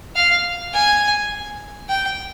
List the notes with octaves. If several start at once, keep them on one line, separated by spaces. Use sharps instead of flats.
F5
G#5
G5